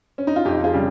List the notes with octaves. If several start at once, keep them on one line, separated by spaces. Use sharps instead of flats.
C#4
D#4
F4
F2 D#4 G4
F4 G#4
C#3 G3